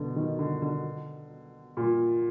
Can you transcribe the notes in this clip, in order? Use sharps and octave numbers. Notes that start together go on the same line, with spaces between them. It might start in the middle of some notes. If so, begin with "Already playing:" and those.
Already playing: B2 D3
D#3
D3
D3
A#2